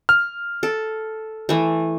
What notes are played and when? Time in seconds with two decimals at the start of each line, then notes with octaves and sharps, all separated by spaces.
0.09 F6
0.63 A4
1.49 E3 A3